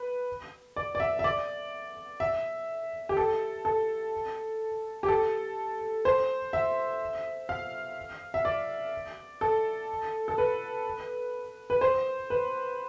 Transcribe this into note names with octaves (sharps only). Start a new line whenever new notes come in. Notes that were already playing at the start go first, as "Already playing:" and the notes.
Already playing: B4
D5
D5
E5
E5
D5
E5
G4
A4
A4
G4
A4
C5
E5
F5
E5
D5
A4
A4
B4
B4
C5
B4